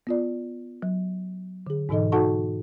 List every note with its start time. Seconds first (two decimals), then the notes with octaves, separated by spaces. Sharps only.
0.07 B3 F4 D5
0.82 F#3
1.67 D3 G#4
1.89 G#2 B2 E3 D#4 A4 D#5
2.12 D#4 F#4 A4 F#5 A5 C#6